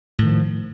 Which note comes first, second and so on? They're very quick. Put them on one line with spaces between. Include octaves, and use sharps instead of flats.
A2 D#3 F3